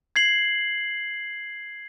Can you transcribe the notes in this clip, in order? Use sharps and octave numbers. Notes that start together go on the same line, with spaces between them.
G#6 C7 F#7